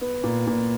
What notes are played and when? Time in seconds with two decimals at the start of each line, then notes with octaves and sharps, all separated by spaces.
0.01 B3
0.24 A#2
0.47 A#2